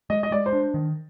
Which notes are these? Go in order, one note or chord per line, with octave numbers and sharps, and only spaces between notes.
G#3 D#5
D#5
G#3 D5
C5
D4
D#3